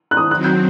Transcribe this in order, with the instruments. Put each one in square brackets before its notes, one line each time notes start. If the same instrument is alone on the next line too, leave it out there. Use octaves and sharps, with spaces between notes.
[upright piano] F#6
D#6
[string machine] D#3 F#3 C4 [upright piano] F#6
[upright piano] G6